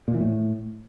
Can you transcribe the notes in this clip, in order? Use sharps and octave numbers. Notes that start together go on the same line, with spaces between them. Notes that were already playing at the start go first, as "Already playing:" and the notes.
A#2
E3
A2